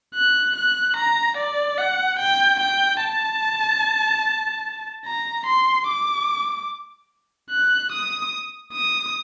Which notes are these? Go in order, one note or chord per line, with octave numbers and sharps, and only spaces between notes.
F#6
F#6
A#5
D5
F#5
G5
G5
A5
A#5
C6
D6
F#6
D#6
D#6